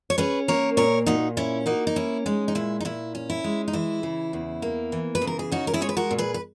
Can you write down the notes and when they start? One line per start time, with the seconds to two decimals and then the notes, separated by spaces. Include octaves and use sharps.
0.10 C#5
0.18 C#4 G#4 B4
0.48 A#3 A#4 C#5
0.77 A#2 A#4 C#5
1.06 A#2 D#4 F#4
1.37 C#4 E4
1.66 A#3 D#4 F#4
1.87 D#4
1.96 C#4 E4
2.26 G#3 D#4
2.48 D#4
2.55 A#2 E4
2.80 D#4
2.85 A#2 E4
3.15 C#4
3.30 E4
3.44 G#3
3.68 D#4
3.73 E3 E4
4.03 C#3
4.33 E2
4.62 A#3
4.92 E3
5.15 B4
5.22 C#3
5.27 A#4
5.39 G#4
5.52 C#4 D#4 F#4
5.67 A#4
5.73 E4 G#4
5.82 G#3 C#5
5.89 B4
5.97 F#4 A#4
6.11 A#2
6.18 G#4 B4
6.34 B4